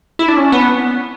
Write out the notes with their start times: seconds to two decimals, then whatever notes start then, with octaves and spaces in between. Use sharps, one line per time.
0.19 E4
0.28 D4
0.37 C#4
0.52 B3